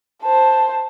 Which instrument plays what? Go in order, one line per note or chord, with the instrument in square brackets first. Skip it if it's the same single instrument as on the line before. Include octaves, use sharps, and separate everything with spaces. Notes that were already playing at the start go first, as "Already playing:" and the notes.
[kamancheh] C5 A5